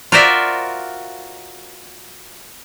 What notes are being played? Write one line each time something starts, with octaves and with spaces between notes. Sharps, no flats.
F4 F#4 A#4 C5 D5 E5